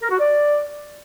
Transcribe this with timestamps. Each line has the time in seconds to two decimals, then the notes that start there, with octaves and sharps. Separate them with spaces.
0.01 A#4
0.10 F#4
0.19 D5